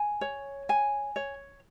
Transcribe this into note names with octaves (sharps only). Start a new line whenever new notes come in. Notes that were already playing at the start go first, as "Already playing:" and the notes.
Already playing: G#5
C#5
G#5
C#5